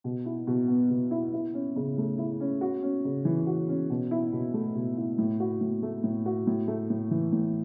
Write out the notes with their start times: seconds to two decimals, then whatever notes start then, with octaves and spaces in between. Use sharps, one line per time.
0.04 B2
0.26 E4
0.47 B2
0.68 B3
0.90 B2
1.11 E4
1.33 E4
1.54 C#4
1.76 C#3
1.98 A3
2.18 E4
2.40 C#4
2.61 F#4
2.83 C#4
3.05 C#3
3.25 E3
3.47 F#4
3.69 C#4
3.90 B2
4.11 E4
4.33 B2
4.54 A3
4.75 B2
4.97 E4
5.18 A2
5.40 F#4
5.61 A2
5.83 A3
6.04 A2
6.26 F#4
6.47 A2
6.68 A3
6.90 A2
7.11 E3
7.32 A2